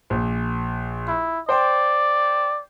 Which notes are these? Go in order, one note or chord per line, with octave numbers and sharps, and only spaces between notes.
A#1
E4
C5 D5 G5 C6